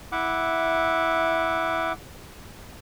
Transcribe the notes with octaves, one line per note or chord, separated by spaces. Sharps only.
E4 E5 F#5 D6